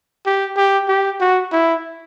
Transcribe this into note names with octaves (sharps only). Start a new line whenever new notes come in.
G4
G4
G4
F#4
E4